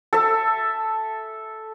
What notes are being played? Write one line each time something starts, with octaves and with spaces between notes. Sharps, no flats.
A4 E5